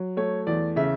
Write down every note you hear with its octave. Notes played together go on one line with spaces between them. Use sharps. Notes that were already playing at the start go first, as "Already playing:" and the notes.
Already playing: F#3
A3 C#5
E2 D5
C#3 E5